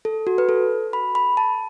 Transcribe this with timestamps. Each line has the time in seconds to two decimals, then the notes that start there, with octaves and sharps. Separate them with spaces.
0.05 A4
0.27 F#4
0.38 B4
0.49 A4
0.93 B5
1.15 B5
1.37 A5